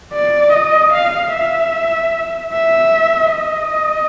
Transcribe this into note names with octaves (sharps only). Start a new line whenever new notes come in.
D5
D#5
F5
E5
E5
D#5